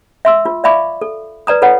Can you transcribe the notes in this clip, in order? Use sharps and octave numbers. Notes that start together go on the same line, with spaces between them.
E5 C6 E6
F4
D5 E5 F5 B5 C#6 D6
A4
B4 D5 A#5 D#6
F4 A4 B4 C#5 F#5